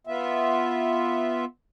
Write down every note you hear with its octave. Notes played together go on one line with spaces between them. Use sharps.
B3 F4 E5